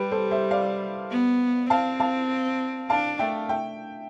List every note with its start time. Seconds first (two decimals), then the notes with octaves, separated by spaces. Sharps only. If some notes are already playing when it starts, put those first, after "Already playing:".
Already playing: G3 G4 B4
0.11 A4 C5
0.31 C5 E5
0.51 D5 F5
1.11 B3
1.70 C4 F5 A5
2.00 F5 A5
2.90 D4 F5 A5
3.19 A3 E5 G5
3.49 E5 G5